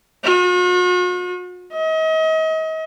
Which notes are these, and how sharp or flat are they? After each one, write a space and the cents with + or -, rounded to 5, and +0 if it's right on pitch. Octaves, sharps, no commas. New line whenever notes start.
F#4 -45
D#5 +35